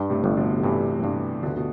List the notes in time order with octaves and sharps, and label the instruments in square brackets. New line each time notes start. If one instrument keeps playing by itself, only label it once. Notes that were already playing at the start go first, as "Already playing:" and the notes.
Already playing: [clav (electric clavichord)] G2
[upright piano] A2 C3
[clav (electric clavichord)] G1
[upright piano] B2 D3
[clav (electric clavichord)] G2 [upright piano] C3 E3
[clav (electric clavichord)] G2
[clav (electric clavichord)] D2 [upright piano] B2 D3
[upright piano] B2